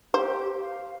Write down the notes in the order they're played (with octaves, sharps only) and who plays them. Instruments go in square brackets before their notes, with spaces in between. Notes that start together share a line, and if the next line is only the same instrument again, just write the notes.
[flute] G4 [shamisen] C5
[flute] F5